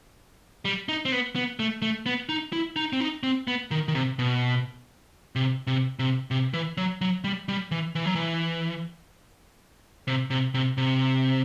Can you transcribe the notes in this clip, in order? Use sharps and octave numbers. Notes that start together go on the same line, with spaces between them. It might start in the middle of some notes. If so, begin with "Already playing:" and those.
G3
D#4
C4
B3
B3
A3
A3
B3
D#4
E4
D#4
C4
D#4
C4
B3
D#3
D#3
C3
B2
C3
C3
C3
C3
E3
F#3
F#3
G3
G3
E3
E3
F#3
E3
C3
C3
C3
C3